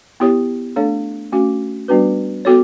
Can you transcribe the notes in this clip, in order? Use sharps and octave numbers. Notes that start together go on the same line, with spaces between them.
B3 E4 G4 C#5
A3 D4 A4 C#5
A3 C#4 F#4
G3 B3 D4 F#4 B4
B3 F#4 A4 C#5